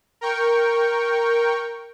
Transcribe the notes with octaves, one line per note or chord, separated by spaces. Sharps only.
A#4 G5 C#6